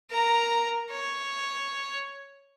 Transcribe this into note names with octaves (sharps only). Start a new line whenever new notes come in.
A#4 A#5
C#5